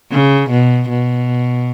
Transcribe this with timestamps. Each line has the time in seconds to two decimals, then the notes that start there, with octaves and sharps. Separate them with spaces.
0.11 C#3
0.50 B2
0.89 B2